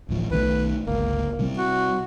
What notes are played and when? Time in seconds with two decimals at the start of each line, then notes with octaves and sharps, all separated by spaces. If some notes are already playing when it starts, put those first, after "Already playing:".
0.09 D1 A1 F3
0.31 B1 D#3 A3 B4
0.87 G1 C#2 A#3
1.39 C3 G3 C4
1.57 F#4